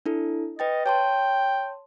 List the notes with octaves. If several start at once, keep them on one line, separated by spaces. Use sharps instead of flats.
D4 E4 A4
B4 D#5 G5 A6
C#5 G5 A5 C6